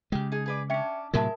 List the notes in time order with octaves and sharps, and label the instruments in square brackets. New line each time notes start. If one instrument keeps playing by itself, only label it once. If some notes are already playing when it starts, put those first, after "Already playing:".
[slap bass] C#3 G#3 [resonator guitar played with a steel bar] G4
[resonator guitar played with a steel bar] D#4 G#4
G#4 B4 D5
[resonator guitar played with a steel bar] C#4 D4 [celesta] E5 G5 C#7
[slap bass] A2 C3 F#3 [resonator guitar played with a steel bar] G#3 E5 [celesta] A#4 A5